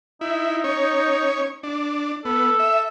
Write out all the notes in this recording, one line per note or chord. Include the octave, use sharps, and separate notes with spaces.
D#4 E4
C#4 C#5
D4
B3 A4
E5